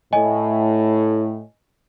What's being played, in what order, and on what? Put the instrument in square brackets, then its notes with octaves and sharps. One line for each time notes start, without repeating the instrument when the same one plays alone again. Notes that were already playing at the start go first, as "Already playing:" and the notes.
[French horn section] A2 [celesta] D#5 G#5